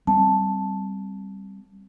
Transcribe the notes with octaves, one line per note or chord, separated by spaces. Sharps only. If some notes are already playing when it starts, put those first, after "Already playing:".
G3 C4 A5